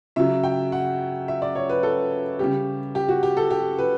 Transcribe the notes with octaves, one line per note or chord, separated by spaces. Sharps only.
C#3 F#3 E5
G5
F#5
E5
D5
C#5
B4
A4
C#3 G3 G4
G4
F#4
G4
A4
G4
B4